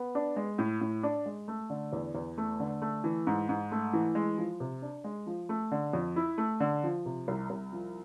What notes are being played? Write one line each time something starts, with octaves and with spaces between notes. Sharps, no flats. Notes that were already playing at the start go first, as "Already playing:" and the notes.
Already playing: B3
D4
G#3
A2
A2
D4
G#3
A3
D3
E2
E2
A3
D3
A3
E3
G#2
G#2
A3
E3
G#3
F3
C3
D4
G#3
F3
A3
D3
F2
E4
A3
D3
F3
C3
C2
C2
F3